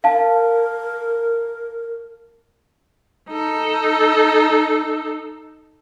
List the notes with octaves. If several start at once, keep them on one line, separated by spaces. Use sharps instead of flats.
A#4 F5 A5
D#4 A4